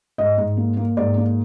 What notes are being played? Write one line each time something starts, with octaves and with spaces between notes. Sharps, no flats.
G#2 D#5
G#2
A#3
A#3
G#2 D5
A#3